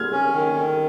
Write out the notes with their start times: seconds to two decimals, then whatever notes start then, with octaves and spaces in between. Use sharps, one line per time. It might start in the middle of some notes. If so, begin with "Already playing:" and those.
Already playing: F6 G#6
0.12 C#4
0.32 D#3
0.54 D#3